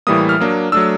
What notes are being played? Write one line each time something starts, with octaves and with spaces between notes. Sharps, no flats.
A2 E3 G3 A#3 D#6
F6
F#3 A#3 D4
F#3 A3 D4 E6